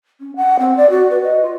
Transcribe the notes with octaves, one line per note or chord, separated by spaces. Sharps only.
C#4
F#5
C4
D5
F#4
B4
D#5
F4